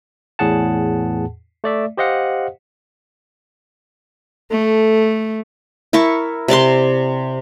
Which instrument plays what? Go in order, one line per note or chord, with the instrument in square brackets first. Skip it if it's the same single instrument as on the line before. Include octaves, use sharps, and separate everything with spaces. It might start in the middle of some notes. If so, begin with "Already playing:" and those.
[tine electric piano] E2 A2 G#4 F#5 A5
A3 D5 E5
G4 C5 D#5 F5 F#5
[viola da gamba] A3 [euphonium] A4
[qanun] E4 A#4 A5 C#6
C3 D5 A5 C6